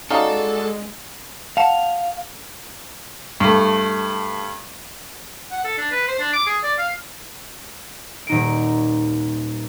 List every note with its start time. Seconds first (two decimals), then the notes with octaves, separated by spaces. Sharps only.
0.11 G#3 C#4 D#4 F#4 A4 D5 F5 F#5
1.57 F5 F#5 A5
3.40 G2 A3
5.51 F#5
5.64 A4
5.78 D4
5.91 B4
6.08 C5
6.19 D4
6.33 D6
6.46 G#4
6.63 D5
6.78 F5
8.27 D#1 D#4 D7